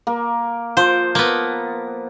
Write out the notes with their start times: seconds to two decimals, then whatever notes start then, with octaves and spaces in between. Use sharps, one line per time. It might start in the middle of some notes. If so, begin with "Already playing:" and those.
0.07 A#3
0.77 F3 C5
1.15 A#3 B3